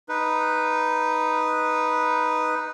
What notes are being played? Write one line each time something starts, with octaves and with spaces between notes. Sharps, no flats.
D#4 B4